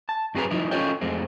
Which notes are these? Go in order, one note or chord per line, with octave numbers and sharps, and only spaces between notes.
A5
F#2 F#3 C4 G#4 B4 A#5
F3 D#4 E4
C#4 F4 A4 C#5 D#5 G5
F2 G#3 A3 C4